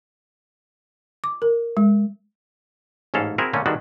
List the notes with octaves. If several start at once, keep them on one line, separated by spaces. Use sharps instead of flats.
D6
A#4
G#3
A1 G#2 C#4 A4 F5
C4 E4 F#4 G#4 A#4
D3 A3 A#3 C#4
D#3 G3 G#3 B3 D4 F#4